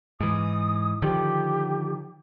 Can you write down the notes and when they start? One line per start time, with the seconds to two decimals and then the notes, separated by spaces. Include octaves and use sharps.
0.20 G#2 E3 D#6
1.02 D3 D#3 F3 G4